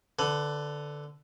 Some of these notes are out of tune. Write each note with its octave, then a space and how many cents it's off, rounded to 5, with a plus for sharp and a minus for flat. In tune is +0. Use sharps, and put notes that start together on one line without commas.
D3 +0 B4 +20